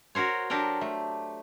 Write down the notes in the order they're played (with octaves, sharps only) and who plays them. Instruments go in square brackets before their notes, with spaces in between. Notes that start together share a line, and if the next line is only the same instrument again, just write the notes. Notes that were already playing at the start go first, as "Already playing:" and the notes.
[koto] F#4 A#4 C5 C#5
F#3 D4 G4 A4 A#4 G5
A3